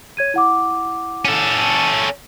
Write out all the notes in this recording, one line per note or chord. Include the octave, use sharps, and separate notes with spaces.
C#5 G#6 D#7
E4 F#5 D6
C#4 A4